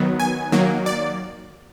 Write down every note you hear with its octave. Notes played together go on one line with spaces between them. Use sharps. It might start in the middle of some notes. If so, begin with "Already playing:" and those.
Already playing: D#3 F#3 B3
G#5
D#3 F#3 A#3
D5